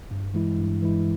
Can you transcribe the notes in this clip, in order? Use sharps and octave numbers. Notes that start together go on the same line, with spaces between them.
G2
E3 G#3 E4
G2
E3 G#3 E4